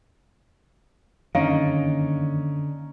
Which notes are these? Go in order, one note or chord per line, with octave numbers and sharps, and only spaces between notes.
F#2 D3 D#3 A#3 C#4 D#4 F5 A#5